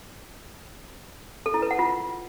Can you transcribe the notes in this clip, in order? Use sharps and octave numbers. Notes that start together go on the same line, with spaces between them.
A4
E4
B4
F#5
F4